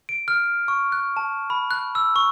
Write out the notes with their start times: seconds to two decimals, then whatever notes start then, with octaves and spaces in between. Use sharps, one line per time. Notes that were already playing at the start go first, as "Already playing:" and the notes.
0.09 D7
0.28 F6
0.68 C#6
0.92 F#6
1.17 A5
1.50 B5
1.71 F#6
1.95 E6
2.16 C#6